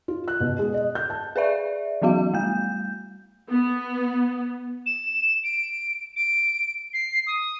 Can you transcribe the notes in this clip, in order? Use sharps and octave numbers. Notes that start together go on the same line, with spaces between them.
F4
F#6
B2
G#3
D#5
G6
A5
G#4 B4 D5 E5
E3 F#3 B3 F#4 F5
G3 A3 G6
B3
E7
D7
D7
C7
D#6